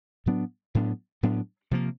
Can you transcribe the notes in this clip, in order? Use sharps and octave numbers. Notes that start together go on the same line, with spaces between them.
A2 F#3 B3 D4
A2 F#3 B3 D4
A2 F#3 B3 D4
C3 F3 A#3